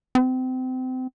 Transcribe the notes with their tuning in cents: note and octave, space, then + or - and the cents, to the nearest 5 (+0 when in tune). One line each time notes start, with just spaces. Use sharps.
C4 -30